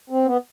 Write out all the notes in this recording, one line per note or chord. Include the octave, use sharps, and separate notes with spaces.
C4
B3